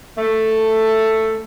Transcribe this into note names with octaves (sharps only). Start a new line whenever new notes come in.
A3